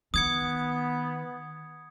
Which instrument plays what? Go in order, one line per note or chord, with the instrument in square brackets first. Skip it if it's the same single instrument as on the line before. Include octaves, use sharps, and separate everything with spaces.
[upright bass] D#3 [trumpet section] B3 [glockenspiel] D#6 G#6 C#7